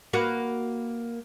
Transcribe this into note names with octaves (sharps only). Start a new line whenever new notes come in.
A#3 F#4 B4